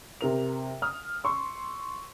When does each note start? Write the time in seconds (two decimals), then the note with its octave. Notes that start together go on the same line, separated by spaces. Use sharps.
0.21 C3 A#4 F7
0.82 D#6 F6
1.24 C6 C#6 E6